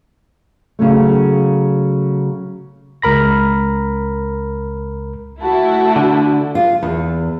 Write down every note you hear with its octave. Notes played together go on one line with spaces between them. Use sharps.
C#3 F#3 A3
C#2 A#4 B5 A#6
A3 E4 F#4 A5
D3
F4
E2